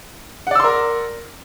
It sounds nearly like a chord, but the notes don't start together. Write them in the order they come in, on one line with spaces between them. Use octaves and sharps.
F#5 D5 E6 C6 A#4